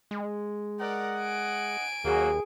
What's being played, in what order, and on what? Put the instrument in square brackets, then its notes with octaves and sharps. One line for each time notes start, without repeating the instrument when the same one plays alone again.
[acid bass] G#3
[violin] A#4 D5 [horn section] D#5 F#5
[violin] G#5 D7
[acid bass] D#2 [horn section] F#3 A#3 F#4 [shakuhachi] G#4